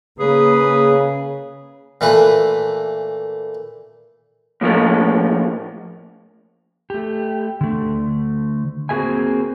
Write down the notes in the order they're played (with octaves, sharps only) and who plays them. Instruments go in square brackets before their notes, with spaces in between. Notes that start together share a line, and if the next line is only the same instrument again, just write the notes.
[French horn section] C#3 [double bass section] A#3 [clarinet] G#4 [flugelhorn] B4
[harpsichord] A#2 E3 A3 B4
[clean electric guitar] A2 F3 A3 A#3
[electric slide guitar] A3 G4
D3 A3
A#3 C4 F#4 G#4 E5 G#5